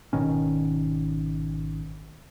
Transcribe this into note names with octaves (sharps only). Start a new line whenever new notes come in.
G#1 B2 D#3 C#4